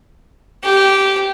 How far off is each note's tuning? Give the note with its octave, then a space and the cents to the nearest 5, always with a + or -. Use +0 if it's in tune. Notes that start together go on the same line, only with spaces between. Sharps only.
G4 -15